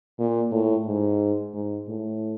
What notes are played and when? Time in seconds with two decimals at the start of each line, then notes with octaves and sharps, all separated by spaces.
0.19 A#2
0.52 A2
0.86 G#2
1.53 G#2
1.88 A2